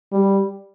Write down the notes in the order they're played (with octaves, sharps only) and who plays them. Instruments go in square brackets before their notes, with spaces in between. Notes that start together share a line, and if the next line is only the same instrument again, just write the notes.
[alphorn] G3